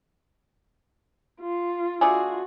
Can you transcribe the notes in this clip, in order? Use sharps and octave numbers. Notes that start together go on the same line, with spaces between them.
F4
A3 D4 F4 F#4 G#4